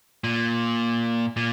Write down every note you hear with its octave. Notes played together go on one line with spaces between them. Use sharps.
A#2
A#2